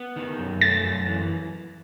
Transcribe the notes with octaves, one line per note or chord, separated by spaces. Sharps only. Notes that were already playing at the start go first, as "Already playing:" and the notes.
Already playing: B3
D#3
F#2
A3 A6
F#2
E3